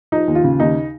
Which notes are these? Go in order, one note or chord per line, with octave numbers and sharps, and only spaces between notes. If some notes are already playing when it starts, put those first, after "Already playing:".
F3 D#4
D#2
F4
C#3
D#2 D#4